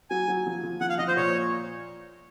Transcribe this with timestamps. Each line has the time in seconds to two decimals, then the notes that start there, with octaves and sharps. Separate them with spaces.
0.10 F#3 G#5
0.28 F#3
0.46 F3
0.63 F3
0.81 F3 F#5
0.89 F5
0.99 F3 D#5
1.08 C5
1.16 A#2 C#5